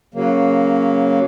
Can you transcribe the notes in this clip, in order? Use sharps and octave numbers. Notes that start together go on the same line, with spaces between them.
C#3 F#3 A#3